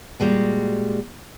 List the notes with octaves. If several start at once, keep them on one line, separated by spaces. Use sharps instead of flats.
A#2 G3 G#3 F#4